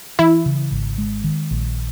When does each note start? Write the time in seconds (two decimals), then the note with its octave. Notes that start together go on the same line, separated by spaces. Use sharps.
0.19 E3 E4
0.46 C#3
0.71 G#1
0.98 G#3
1.24 D#3
1.51 A#1